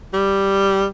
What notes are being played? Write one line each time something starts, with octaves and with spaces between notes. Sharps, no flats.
G3